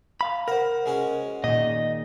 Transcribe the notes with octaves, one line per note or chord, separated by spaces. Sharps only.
F5 B5
A#4 C5 F#5
G#3 C#4 F#4
A#2 D#3 D#5